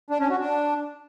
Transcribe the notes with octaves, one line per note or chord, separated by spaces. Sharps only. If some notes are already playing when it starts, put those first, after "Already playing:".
D4
C#4
F#4
D4